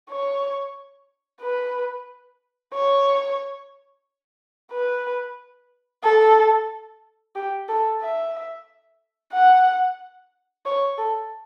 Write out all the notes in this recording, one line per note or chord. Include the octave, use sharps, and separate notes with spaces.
C#5
B4
C#5
B4
A4
G4
A4
E5
F#5
C#5
A4